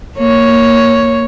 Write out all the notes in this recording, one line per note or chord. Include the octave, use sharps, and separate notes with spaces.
A#3 C#5